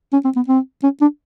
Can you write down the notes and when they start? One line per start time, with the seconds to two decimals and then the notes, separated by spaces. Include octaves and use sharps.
0.13 C#4
0.24 C4
0.36 B3
0.48 C4
0.83 C#4
1.01 D4